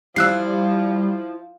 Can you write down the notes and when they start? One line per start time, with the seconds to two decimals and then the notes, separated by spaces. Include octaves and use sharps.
0.16 F3 G3 E4 F4 C5 E6 F#6 C7